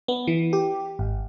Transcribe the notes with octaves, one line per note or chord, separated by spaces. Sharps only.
B3
E3
G4
G#1